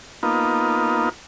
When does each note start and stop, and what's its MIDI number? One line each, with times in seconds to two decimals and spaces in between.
0.23 1.09 58
0.23 1.09 59
0.23 1.09 63
0.23 1.09 65